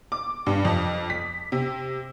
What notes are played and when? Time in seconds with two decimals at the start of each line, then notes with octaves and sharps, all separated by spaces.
0.12 D6
0.47 G2
0.65 F2
1.10 B6
1.52 C3